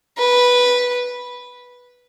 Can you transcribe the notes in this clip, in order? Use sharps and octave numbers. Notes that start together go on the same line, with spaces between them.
B4